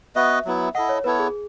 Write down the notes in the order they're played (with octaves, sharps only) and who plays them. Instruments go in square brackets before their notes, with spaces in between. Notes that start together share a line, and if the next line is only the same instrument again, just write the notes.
[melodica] B3 F#4 B4 D#5 [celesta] E5
[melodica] F#3 B3 E4
[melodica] E4 A4 D#5 [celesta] F#5
[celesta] C#5
[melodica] B3 E4 A4 C#5 [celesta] B4
[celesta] G#4